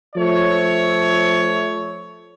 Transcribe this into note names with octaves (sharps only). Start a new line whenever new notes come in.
F3 A3 C#5